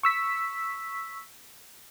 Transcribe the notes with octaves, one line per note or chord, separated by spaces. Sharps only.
C#6 E6 B6